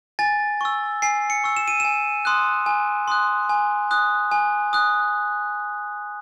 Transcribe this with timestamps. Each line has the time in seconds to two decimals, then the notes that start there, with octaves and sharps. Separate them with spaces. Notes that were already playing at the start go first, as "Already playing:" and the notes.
0.19 G#5 A6
0.61 C#6 E6
1.02 G#5 C7
1.30 C#7
1.44 C#6 E6
1.57 E7
1.68 D#7
1.80 G#5 E7
2.25 C6 D#6 F#6
2.66 G#5
3.08 C6 D#6 F#6
3.49 G#5
3.91 D#6 F#6
4.32 G#5
4.73 D#6 F#6